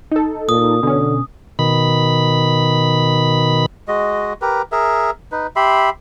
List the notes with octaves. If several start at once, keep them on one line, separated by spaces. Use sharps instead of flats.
D#4 A4
A#2 D#6
B2 D3 C#4
B2 D#3 B5
G#3 F#4 D#5
G4 A#4 B4
G#4 A#4 E5
D#4 B4
G4 E5 B5 C6